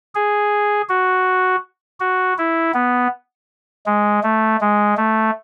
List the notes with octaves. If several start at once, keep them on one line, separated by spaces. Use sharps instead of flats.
G#4
F#4
F#4
E4
B3
G#3
A3
G#3
A3